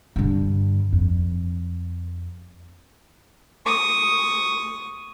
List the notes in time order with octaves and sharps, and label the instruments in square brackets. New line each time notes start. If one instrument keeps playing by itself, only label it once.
[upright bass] G2 D3
F2
[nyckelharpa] C#6 D#6